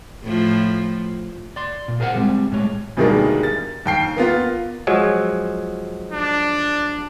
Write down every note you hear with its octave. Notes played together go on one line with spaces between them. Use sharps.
A2 F3
D5 C6
A#2
G#4 A#4 C5 F5 F#5
A2 G3 G#3 C4
A2 G#3 C#5
D2 B2 D#3 G3 G#3 A#3
A6
D#2 G5 C7
A#3 B3 F4
F3 F#3 G#3
D4